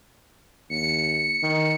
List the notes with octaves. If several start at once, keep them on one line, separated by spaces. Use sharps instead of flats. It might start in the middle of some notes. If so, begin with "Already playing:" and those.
D#2 C#7
D#3